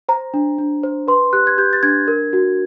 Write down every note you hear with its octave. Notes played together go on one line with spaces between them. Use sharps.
C5 A#5
D4
D4
C5
B4 C6
G4 F#6
G#6
G4 G6
A6
D4 G#6
A#4
F#4